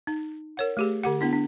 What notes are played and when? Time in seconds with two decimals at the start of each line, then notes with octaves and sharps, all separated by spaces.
0.07 D#4
0.57 A#4 C#5 F#5
0.77 A3 G4 G#4
1.04 D3 G4 F#5
1.21 B3 D4 E4
1.33 D4